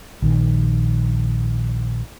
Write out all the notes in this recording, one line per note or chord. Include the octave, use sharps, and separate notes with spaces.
A#1 D#3